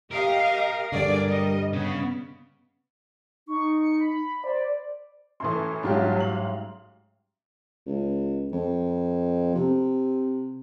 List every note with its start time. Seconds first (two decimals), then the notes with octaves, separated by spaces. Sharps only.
0.11 G4 A#4 D#5 F5
0.92 G2 D3 D4 G#4 D5
1.26 G3 D#5
1.73 C#3 B3
3.47 D#4 C#6
3.81 C#7
4.00 B5
4.44 C5 D5
5.40 F#2 A2 E3 A4 C6
5.83 A1 G#2 F#3 G3 D4 F4 G4
6.16 F5 F#7
7.86 C#2
8.53 F2
9.55 C3